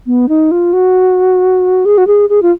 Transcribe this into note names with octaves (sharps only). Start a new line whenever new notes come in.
B3
D#4
F4
F#4
G#4
F#4
G#4
G#4
F4